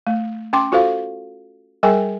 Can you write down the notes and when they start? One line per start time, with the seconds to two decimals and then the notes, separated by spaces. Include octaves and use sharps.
0.07 A3
0.53 C#4 G5 C6 D6
0.72 F4 F#4 A4 C5 F5
1.83 G3 G#4 A#4 G5 G#5